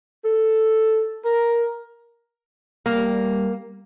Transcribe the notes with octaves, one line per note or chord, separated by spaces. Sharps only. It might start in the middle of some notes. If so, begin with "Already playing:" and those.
A4
A#4
G3 A#3